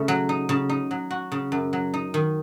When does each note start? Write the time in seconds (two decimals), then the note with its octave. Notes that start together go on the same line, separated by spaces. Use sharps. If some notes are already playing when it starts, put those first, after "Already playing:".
Already playing: C#3 A3
0.08 F#3
0.29 D#4
0.49 C#3
0.69 D#4
0.91 F#3
1.11 F#4
1.32 C#3
1.52 F#2
1.73 F#3
1.94 D#4
2.14 D#3